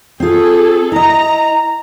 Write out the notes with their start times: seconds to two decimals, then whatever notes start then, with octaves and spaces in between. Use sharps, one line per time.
0.20 C4 F4 G#4 A4
0.92 E4 D#5 A#5